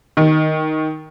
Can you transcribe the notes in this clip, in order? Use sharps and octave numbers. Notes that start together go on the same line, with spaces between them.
D#3